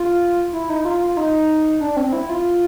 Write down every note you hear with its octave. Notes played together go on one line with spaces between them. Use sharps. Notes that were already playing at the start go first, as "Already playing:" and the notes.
Already playing: F4
E4
D#4
F4
F4
D#4
D4
C4
E4
F4